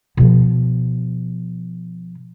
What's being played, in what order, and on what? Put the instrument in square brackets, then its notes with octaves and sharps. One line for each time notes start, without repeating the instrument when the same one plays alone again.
[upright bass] B2 F3